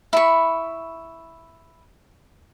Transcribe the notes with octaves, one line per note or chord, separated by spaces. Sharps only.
E4 B5 C#6